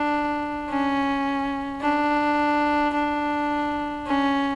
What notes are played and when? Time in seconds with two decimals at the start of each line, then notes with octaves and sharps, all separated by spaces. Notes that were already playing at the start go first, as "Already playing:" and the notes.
Already playing: D4
0.70 C#4
1.81 D4
2.94 D4
4.07 C#4